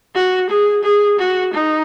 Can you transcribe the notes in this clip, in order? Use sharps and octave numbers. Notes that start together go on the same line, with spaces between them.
F#4
G#4
G#4
F#4
D#4